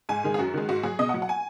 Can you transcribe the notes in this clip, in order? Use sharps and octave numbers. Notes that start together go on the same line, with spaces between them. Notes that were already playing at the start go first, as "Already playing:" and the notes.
G#2 G#5
D#3 G#3
G#4
F#2 F#4
D#3 G#3
G#2 F#4
F#3 G#4
B2 D#5
F#5
F#3
F#5
G#5